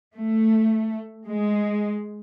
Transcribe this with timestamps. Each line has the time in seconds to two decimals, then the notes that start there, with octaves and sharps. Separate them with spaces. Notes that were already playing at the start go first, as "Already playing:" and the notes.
0.13 A3
1.27 G#3